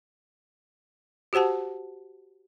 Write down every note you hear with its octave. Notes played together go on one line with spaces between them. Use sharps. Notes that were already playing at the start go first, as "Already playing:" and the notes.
F#4 G4 C5 F#5 A5